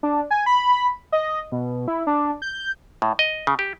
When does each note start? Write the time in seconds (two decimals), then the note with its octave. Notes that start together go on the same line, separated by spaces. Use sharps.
0.03 D4
0.31 G#5
0.46 B5
1.12 D#5
1.52 B2
1.88 E4
2.07 D4
2.42 G6
3.02 A2
3.19 D#5
3.47 C#3
3.59 G4